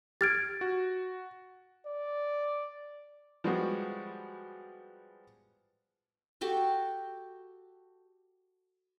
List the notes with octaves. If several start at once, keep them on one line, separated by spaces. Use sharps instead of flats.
G4 F6 G#6 A6 D7
F#4
D5
F3 G3 G#3 B3 F#4
F#4 G4 A4 G5